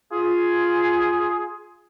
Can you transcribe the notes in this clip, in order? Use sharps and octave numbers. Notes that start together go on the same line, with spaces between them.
F4 G#4